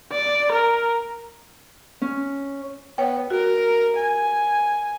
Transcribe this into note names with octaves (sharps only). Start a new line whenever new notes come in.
D5
A#4
C#4
B3 C#5 G5
F#4 A#4
G#5